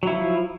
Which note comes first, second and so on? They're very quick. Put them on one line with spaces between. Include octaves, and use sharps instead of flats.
F#3 E4 F3